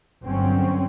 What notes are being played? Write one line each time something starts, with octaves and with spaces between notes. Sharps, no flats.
G1 F#3 C4 C#4